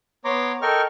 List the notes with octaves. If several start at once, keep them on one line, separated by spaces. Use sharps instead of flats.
B3 C#5 A#5 C6 D6
A4 A#4 D#5 G5 C#6 F6